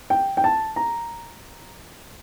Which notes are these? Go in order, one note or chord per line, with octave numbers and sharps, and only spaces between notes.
G5
G5
A5
A#5